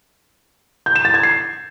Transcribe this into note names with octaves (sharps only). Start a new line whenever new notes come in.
G6
E7
A6
G#6
C7